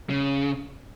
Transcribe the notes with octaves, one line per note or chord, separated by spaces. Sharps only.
C#3